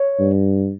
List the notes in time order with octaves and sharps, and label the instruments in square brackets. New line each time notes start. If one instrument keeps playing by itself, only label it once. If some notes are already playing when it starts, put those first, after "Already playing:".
Already playing: [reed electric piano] C#5
[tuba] G2